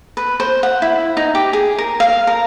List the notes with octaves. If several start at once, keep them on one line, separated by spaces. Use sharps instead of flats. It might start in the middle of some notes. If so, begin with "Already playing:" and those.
B4
C5
F#5
E4
D#4
G4
G#4
A#4
F5
A#4